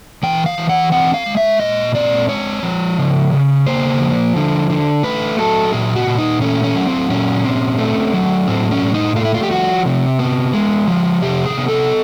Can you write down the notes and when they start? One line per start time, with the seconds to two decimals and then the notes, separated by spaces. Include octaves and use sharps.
0.23 E3 G5
0.46 F5
0.58 E3
0.69 F#5
0.92 C4 F#5
1.14 F5
1.26 G#3
1.37 E5
1.60 A#2 D#5
1.95 C4 D5
2.29 G#3 C#5
2.63 F3
2.98 C#3
3.33 C#3
3.67 A#3 C5
4.00 F3
4.36 D3
4.70 D3
5.03 A3 B4
5.39 F#3 A4
5.73 A#2 G#4
5.96 F#4
6.07 A#2
6.18 D#4
6.41 A3 C#4
6.64 C#4
6.75 F#3
6.87 C4
7.10 A#2 C#4
7.45 C4
7.78 A3
8.14 F#3
8.48 A2 C4
8.71 C#4
8.82 A2
8.94 D#4
9.16 A3 F4
9.25 E4
9.34 F4
9.43 G4
9.51 F3 F#4
9.86 C3
10.19 B3
10.54 G#3
10.88 F3
11.22 C3 G4
11.46 G#4
11.57 B3
11.68 A4